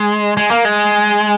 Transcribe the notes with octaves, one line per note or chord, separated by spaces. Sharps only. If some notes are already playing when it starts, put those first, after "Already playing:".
Already playing: G#3
G#3
A#3
G#3